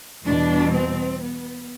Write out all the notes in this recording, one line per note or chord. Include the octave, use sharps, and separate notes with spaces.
E2 B2 G3 D4
C4
B3